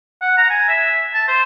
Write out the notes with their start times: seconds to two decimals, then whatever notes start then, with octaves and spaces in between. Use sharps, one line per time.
0.22 F#5
0.37 A#5
0.50 G#5
0.69 E5
1.14 A5
1.28 C5